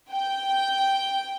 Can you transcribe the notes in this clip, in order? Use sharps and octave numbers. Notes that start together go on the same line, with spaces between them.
G5